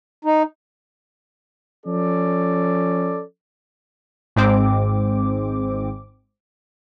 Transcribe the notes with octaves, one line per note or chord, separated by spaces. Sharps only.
D#4
F3 C#4 A4 D5
G#1 G#2 G#3 C4 D6